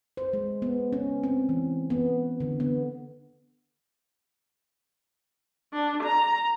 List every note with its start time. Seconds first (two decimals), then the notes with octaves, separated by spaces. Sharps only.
0.17 C5
0.33 G#3
0.62 B3
0.93 C#4
1.23 C4
1.49 E3
1.90 B3
2.40 D3
2.60 B3
5.73 D4
6.03 A#5